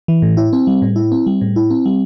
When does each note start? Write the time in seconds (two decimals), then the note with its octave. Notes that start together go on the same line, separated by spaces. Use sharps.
0.08 E3
0.22 A2
0.37 E4
0.53 C4
0.67 G3
0.82 A2
0.96 E4
1.12 C4
1.26 G3
1.41 A2
1.56 E4
1.70 C4
1.86 G3